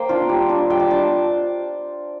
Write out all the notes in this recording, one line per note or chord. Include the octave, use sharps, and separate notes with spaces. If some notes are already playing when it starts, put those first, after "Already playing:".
Already playing: A#3 C5 G5
D4 F4
G3
D4 F4
G3 G5
A5
D4 F4 A5